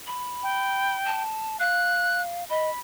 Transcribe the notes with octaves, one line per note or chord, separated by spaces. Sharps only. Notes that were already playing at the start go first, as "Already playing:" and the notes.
B5
G5
A5
F5 F#6
D#5 B5